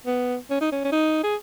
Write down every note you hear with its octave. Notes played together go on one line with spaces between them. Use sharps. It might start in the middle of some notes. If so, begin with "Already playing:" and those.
B3
C#4
D#4
C#4
C#4
D#4
G#4